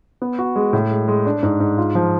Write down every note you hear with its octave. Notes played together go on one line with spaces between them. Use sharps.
B3
F#4
G#3
A2
G#3
G#3
D4
G#2
G#2
F4
F3